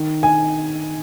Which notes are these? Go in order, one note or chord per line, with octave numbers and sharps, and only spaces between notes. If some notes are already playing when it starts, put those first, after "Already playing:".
Already playing: D#3
G#5